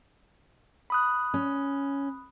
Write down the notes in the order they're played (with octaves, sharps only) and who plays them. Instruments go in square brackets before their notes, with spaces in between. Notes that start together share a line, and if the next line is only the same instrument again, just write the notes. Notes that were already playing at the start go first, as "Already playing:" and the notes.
[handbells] B5 D#6 F#6
[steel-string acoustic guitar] C#4